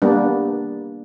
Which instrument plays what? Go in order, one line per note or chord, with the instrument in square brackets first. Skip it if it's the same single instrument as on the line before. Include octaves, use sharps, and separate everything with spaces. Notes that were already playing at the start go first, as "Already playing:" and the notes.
[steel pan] G3 A#3 B3 D4